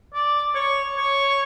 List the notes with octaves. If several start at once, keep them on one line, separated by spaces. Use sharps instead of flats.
D5
C#5
C#5